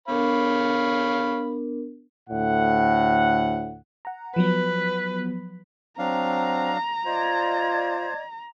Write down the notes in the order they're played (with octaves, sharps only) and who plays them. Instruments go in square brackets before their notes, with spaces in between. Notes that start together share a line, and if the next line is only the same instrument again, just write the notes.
[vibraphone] B3 D4 A#4 [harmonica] C#5 F5 B5
[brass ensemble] D2 A2 F#5
[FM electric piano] F#5 A#5
[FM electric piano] F3 F#3 B3 [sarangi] B4
[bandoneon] F#3 D4 F5 [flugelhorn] C4 [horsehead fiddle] A#5
[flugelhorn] F4 [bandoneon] C5 [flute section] D5 D#5 G#6